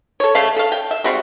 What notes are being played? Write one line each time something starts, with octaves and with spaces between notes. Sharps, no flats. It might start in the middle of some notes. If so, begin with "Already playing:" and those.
A4 C#5
C#3 A3 F5
A4 F5
G5
E5
G3 G#3 C4 F#4